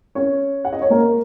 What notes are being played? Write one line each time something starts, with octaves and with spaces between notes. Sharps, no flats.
C#4 C#5
F#5
D#5
C#5
A#3 A#4